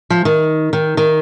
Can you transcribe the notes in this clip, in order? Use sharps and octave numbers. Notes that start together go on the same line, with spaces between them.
F3
D#3
D#3
D#3